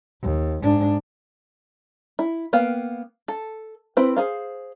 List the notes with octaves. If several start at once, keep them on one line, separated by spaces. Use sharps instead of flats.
D#2
G#2 D4
E4
A#3 B3 F5 G5
A4
C4 E4 B4 C5
G#4 C5 F5